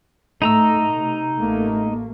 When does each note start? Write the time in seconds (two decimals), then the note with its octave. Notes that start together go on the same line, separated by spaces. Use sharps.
0.42 A2 A3 D#4 A#5 E6
0.93 C3
1.38 A1 A3 A#3